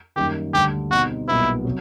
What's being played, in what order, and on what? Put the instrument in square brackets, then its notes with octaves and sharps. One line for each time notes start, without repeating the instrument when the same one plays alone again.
[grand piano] F#2 D#3 G3 A#3 [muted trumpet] G4
[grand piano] D2 D3 G3 [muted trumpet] G4
[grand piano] B2 G3 C4 D#4 [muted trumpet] F#4
[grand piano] B1 A#2 G3 B3 [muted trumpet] E4
[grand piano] C3 F#3